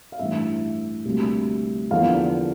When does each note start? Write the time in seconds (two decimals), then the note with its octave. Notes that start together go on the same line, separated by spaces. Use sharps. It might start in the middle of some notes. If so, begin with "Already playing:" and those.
0.12 F5
0.19 A1 G2 E3 E5
1.05 D2 C3 G3 A#3
1.91 E2 D3 F3 A#3 D4 F5